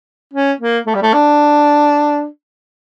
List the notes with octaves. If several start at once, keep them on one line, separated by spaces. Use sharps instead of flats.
C#4
A#3
A3
G3
A3
D4